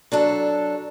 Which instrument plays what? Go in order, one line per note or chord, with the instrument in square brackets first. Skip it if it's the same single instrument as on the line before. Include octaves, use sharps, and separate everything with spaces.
[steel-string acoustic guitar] F#3 D4 A4